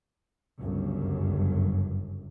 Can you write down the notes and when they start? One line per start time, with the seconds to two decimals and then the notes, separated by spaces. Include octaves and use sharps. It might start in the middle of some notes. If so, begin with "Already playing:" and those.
0.59 G1 C#2 F#2